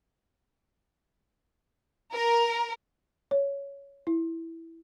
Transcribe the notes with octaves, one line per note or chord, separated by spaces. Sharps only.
A#4
C#5
E4